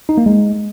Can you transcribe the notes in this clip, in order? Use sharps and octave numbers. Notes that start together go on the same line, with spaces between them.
D#4
A#3
G#3